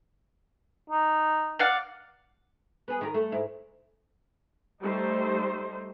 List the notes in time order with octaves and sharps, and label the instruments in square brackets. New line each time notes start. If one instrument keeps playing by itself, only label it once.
[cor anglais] D#4
[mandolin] D5 F5 F#5
[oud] B3 G#4
D#3 G4 A#4
A3
G#2 E4
[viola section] G3 A3 D#4 C5